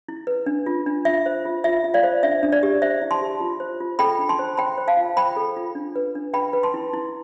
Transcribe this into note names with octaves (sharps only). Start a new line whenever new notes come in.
E4
B4
D4
F4
D4
F4 E5
C5
F4
F4 E5
F4
D5 F5
C5
D4 E5
D4
D5
G4
C5 E5
E4
A5 C6
G4
F4
C5
F4
A4 G5 B5
D4
A5 C6
C5
C5 G5 B5
C5
F5 A5
F4
C5 G5 B5
A4
F4
D4
B4
D4
B4 G5 B5
B4
A5 C6
E4
E4